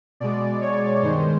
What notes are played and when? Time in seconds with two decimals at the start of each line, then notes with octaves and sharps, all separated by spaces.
0.20 B2 G#3 D5
0.62 C#5
1.02 G2 D#3 G#3 C5